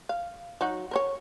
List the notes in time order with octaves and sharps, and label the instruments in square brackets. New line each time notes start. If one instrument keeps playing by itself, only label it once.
[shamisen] F5
F#3 D#4 F#4
A#4 C5 C#5